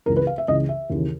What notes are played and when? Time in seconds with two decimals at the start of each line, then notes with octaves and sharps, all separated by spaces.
0.06 C#2 C#3 E3 A#4
0.17 B4
0.27 F5
0.38 E5
0.48 C#2 C#3 E3 D#5
0.69 E5
0.90 D#2 C#3 E3